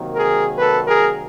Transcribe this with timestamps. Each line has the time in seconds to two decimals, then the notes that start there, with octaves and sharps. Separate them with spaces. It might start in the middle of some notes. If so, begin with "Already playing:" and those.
Already playing: C3 D#3 F#3 A#3
0.14 G#4 A#4
0.58 A4 B4
0.87 G#4 A#4